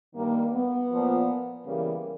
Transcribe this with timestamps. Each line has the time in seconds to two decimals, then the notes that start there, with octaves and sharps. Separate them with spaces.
0.15 G2 D#3 G3 A#3
0.53 B3
0.90 A#2 F3
1.65 E2 C#3 E3 G3 A#3